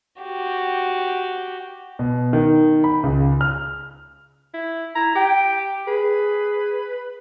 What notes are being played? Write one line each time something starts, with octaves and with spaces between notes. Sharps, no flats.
F#4 G4
B2
D#3
B5
C#2
F6
E4
E4 A#5
G4 G5
G#4 B4